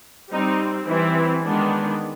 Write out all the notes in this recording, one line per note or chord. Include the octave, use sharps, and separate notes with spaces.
G3 C4 D#4
E3 G3 C4 E4
D#3 G#3 B3 D4